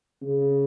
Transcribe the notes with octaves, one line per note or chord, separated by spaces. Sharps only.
C#3